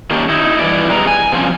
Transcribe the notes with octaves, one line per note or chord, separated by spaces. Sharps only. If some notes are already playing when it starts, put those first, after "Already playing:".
D#3 A#3 C#4 D4 G4
D#4 E4
G2 E3 E4 D5
B2 G3 G#4 B4 A#5
G#5
C3 F3 A#3 C4 C#4